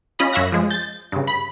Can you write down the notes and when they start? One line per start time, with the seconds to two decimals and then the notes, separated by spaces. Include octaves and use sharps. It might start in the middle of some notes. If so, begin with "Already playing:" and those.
0.19 C#4 F4 D#5 B5
0.32 F#2 C#5 E5 F5 F#6 A#6
0.52 F3 G#3
0.70 G6 A6
1.12 G2 C#3
1.27 B5